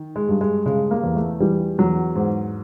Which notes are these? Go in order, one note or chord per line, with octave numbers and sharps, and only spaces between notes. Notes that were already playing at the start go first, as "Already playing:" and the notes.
Already playing: D#3
G#3
G2
G#3
C#3 G#3
A#3
E2
A3
E3 G3
E2 F#3
G#2